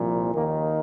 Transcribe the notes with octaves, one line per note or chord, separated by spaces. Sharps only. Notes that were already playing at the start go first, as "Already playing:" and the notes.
Already playing: C2 A#2 F3
D#2 D#3 A#3